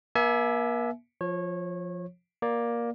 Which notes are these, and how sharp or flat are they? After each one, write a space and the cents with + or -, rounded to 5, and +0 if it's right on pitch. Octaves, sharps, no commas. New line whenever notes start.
A#3 +45 E5 +0 G#5 +40
F3 +5 C#5 -25
A#3 +15 D5 +0